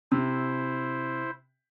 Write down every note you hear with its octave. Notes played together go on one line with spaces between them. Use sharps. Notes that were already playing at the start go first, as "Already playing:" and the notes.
C3 E4 C5